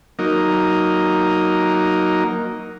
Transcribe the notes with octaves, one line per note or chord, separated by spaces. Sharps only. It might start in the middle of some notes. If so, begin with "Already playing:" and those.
F#3 A#3 D#4